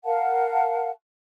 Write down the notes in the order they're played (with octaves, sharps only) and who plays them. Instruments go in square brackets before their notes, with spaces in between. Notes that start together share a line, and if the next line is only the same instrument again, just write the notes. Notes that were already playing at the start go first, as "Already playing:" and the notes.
[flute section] A#4 F5 F#5 A5